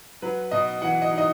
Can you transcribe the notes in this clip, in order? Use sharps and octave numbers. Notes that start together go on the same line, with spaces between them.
F#3 B4
B2 D#5
E3 F#5
D#5
D#4
D#5